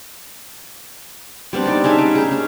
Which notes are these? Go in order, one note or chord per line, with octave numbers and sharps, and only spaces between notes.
G3 B3 C4 D4
D4 D#4 D5
C#4 D#4 G#4 E5
G3
D#4 G#4
C#4